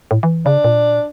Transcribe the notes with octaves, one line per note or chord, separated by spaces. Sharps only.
A2
E3
C#3 D4
A#2